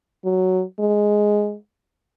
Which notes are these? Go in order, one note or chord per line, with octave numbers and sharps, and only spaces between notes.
F#3
G#3